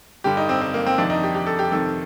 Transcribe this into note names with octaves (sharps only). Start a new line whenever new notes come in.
G2 D3 G4
D#4
C4
C4
A#3
C4
F2 C3 D#3 D4
D#4
G4
G4
A4
G4
F2 C3 D#3 A4